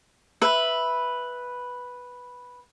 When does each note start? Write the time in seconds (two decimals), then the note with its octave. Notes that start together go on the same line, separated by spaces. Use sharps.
0.41 B4 E5